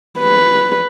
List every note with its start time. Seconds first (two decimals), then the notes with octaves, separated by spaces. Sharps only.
0.19 B4